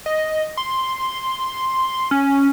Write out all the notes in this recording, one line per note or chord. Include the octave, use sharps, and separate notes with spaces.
D#5
C6
C#4